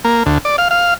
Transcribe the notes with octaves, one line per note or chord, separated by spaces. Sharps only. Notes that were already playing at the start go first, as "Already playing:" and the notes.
A#3
D2
D5
F5
F5